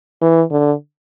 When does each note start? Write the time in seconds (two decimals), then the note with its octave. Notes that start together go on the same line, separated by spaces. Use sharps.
0.21 E3
0.51 D3